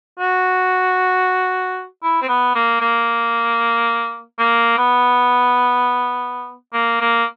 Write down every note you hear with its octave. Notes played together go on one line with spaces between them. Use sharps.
F#4
E4
C4
B3
A#3
A#3
A#3
B3
A#3
A#3